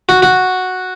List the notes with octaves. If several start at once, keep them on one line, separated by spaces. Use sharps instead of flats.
F#4
F#4